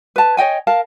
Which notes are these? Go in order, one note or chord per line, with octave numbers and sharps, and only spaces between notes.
B4 A5
C#5 D#5 G5 G#5
A#4 F5 A5